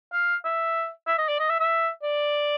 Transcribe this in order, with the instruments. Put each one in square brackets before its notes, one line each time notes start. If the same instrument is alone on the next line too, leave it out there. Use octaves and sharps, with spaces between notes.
[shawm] F5
E5
E5
D#5
D5
D#5
E5
E5
D5